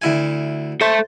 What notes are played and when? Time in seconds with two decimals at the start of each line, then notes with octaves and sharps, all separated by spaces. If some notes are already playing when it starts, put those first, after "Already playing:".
0.02 D2 E4 G#5
0.81 A4 C5 E5